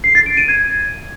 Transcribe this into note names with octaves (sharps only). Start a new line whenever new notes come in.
C7
A6
D7
D#7
G#6